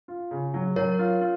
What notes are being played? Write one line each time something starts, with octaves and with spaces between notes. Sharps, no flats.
F4
C#3
F#3
F#3 A#4 C#5
F4
F4